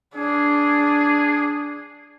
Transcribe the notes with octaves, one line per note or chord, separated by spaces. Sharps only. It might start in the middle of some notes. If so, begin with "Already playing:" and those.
D4 G#4